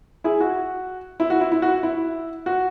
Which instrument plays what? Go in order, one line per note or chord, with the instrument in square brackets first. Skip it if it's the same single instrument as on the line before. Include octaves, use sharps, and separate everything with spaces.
[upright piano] E4 G#4
F#4
E4
F#4
E4
E4
F#4
E4
F#4